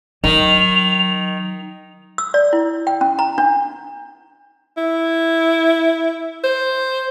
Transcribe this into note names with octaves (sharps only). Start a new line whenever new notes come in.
D#3 F#3 F7
E6
D5
E4
G5
C#4
A#5
D4
E4
C5